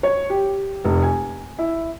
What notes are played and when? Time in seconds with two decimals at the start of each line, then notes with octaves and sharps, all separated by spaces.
0.03 C#5
0.30 G4
0.84 F1
1.02 G#5
1.59 E4